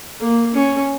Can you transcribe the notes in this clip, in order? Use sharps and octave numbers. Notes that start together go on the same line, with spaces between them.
A#3
C#4